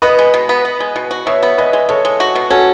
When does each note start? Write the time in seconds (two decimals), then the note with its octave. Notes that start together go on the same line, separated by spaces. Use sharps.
0.02 B3 B4 D#5
0.19 G#3
0.34 B2
0.49 B3
0.65 B3
0.80 G#3
0.96 B2
1.11 F#4
1.26 B2 C#5 E5
1.43 B3
1.58 G#3 B4 D#5
1.73 G#3
1.89 G#3 A4 C#5
2.05 G#3
2.20 F#4
2.35 B2
2.50 C#4 F#4 A4